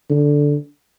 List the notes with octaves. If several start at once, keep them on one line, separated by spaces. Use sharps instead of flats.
D3